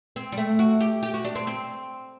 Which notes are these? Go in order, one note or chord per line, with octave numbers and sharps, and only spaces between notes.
C4
G3
A3
F#4
G4
G4
F#4
D4
C4
C4